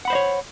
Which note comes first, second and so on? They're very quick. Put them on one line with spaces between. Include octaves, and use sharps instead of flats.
F#5 B5 C5 D#5 C#5